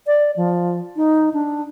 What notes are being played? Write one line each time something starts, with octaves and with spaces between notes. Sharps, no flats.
D5
F3
D#4
D4